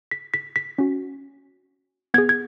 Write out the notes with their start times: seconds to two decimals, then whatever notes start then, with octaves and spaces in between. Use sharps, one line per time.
0.11 B6
0.34 B6
0.56 B6
0.78 C#4 F#4
2.14 B3 G#4 G#6
2.29 G#6